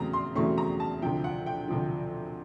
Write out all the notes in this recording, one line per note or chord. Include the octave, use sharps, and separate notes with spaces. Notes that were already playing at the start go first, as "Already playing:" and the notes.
Already playing: E2 C#3 F#3 A3 C4 A#5
C6
E2 C#3 F#3 A3 C4 C#6
A#5
A5
D2 C3 F3 G5
F#5
G5
D2 C3 F3